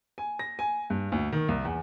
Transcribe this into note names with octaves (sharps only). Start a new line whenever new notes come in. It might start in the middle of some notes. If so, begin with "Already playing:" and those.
G#5
A#6
G#5
G2
D2
D#3
C2
E2